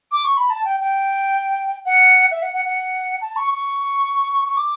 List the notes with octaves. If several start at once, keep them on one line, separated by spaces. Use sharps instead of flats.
D6
C#6
B5
A5
G5
G5
F#5
E5
F#5
F#5
F#5
A5
C#6
C#6
C#6
D6